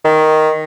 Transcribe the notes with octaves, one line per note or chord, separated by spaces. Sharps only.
D#3